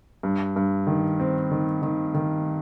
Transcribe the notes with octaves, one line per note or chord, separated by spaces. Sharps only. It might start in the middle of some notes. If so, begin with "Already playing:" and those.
G2
G2
D#3
C4
D#3
D#3
D#3